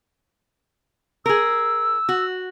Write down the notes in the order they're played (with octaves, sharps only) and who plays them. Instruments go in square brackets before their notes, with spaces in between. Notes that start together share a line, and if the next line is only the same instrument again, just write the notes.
[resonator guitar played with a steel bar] G#4 A#4 [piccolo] E6
[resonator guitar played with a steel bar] F#4